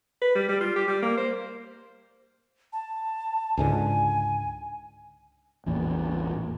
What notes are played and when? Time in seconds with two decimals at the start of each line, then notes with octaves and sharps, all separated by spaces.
0.21 B4
0.35 G3
0.49 G3
0.61 F4
0.76 G4
0.88 G3
1.02 A#3
1.17 C5
2.73 A5
3.57 C#2 G#2 D3 G#5
5.66 A1 E2 A#2